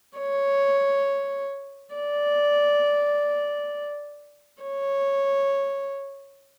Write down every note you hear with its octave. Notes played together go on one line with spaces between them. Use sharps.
C#5
D5
C#5